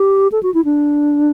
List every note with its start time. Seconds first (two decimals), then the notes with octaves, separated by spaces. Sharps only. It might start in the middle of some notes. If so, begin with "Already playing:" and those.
Already playing: G4
0.32 A4
0.43 F#4
0.54 E4
0.65 D4